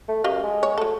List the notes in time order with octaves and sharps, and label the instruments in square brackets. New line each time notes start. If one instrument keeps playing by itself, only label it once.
[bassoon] A3
[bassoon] F#2 [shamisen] G4 D#5 F5
[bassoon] G#3
[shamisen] C#5
[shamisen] F#3 A4 [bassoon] A3